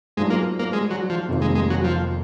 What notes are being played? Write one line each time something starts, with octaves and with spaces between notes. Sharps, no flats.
G#2 F#3 G#3 D4 F4
A#3
A#3
G#3
F#3
F3
F1 F2 D#3 A#3
G#3
G#3
F#3
F3